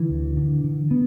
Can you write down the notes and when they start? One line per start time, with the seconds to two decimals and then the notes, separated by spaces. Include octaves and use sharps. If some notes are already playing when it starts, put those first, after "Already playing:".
Already playing: D3 E3
0.10 D2
0.37 D3
0.64 D3
0.91 B3